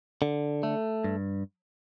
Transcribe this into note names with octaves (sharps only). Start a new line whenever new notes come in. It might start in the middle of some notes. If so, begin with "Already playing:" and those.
D3
A3
G2